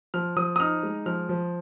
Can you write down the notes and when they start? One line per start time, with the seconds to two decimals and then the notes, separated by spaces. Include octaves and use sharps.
0.14 F3 F6
0.36 F3 D#6
0.56 D#6
0.60 D#4 F6
0.83 G#3
1.06 F3 F6
1.29 F3